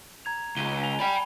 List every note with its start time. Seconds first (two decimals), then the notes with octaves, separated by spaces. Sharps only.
0.25 A#5 G#6 F7
0.57 C#2 D#7 G7
0.83 G#5 F7 G7
1.00 D5 G5 B5